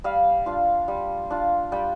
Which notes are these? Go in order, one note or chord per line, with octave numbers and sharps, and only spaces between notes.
G3 F5
D4 F4
G3
D4 F4
G3 G5